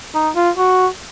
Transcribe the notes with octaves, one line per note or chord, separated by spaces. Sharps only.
D#4
F4
F#4